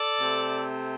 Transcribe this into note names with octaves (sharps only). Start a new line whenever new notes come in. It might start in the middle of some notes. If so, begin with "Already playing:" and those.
Already playing: A4 D5
C3 A3 C4